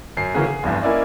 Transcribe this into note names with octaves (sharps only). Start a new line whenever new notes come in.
F#2 C7
C#3 E3 F#3 A#3 C#4 G#4
G#4
F1 E2 G2
A#3 C#4 E4 D5 D#5